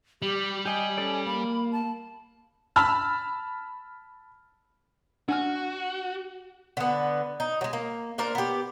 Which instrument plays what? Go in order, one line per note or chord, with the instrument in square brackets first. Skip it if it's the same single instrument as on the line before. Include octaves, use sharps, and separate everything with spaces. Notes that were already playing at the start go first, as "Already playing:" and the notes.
[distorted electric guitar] G3 [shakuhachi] G4
[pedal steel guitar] G4 D#5 G5 [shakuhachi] G#5
[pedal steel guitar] C#4 A4 D5
[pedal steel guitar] A#3 [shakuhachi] B5
[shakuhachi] A5
[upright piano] A5 B5 E6 F6
[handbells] D4 G#5 F6 [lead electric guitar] F#4
[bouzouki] D3 B3
D#4
F#3 G#3
A#3
A#3 D4 A#4 C5
B3 G4